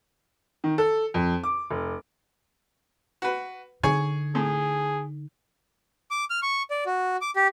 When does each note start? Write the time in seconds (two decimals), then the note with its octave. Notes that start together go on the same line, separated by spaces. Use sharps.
0.64 D#3
0.78 A4
1.14 F2
1.43 D6
1.70 F1
3.22 F#4 B4
3.83 D3 D#4 G#4 C#5 G#5
4.35 A2 G#4
6.11 D6
6.30 F6
6.43 C#6
6.70 D5
6.86 F#4
7.21 D6
7.36 G4